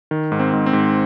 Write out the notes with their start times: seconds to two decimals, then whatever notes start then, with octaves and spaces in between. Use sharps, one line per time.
0.11 D#3
0.32 G#2
0.39 C4
0.53 G#2
0.66 C4
0.73 G#2